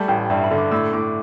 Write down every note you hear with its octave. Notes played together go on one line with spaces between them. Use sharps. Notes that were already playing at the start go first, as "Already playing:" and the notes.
Already playing: G3 A3 A5
A1 G5
G2 E5
B5
D3
D6
A2 E6
A2 D6